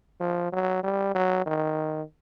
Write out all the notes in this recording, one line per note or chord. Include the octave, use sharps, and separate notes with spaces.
F3
F#3
G3
F#3
D#3